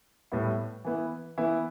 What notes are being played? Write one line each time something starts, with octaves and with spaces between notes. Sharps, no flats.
A2 G3 B3 E4
E3 B3 E4
E3 B3 E4